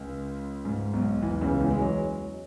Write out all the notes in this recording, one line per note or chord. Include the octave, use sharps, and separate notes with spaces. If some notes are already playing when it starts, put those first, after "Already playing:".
Already playing: C#2 C#3
G#2
B1 B2
E2 E3
C#2 C#3
E2 E3
G#3
F#3